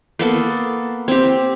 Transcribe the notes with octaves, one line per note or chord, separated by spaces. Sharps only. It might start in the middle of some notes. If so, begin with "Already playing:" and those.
A#3 B3 A4
C4 G4